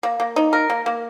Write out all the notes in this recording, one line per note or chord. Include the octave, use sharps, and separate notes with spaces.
A#3
A#3
D#4
A#4
A#3
A#3